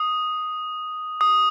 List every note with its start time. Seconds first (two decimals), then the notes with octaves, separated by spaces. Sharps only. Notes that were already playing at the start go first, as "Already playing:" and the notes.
Already playing: D#6
1.21 D#6